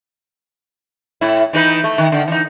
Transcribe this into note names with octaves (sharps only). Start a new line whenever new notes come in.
A2 E4
E3 D#4 B4
A3
D#3
D3
E3 D#4